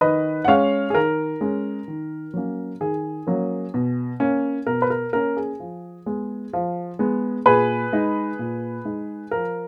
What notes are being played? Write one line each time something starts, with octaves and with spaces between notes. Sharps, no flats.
D#3 B4 D#5
F#5
G#3 C#4 C#5 F5
G#4
D#3 A#4
G#3 C#4
D#3
F#3 A#3 C#4
D#3 G#4
F#3 A#3 C#4
B2
A#3 C#4
B2 A#4
B4
A#4
A#3 C#4 A#4
G#4
F3
G#3 B3
F3
G#3 B3
A#2 G#4 B4
G#3 D#4
A#2
G#3 D#4
F3 A#4